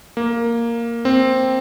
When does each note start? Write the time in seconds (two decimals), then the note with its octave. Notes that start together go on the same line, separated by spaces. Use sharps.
0.17 A#3
1.05 C4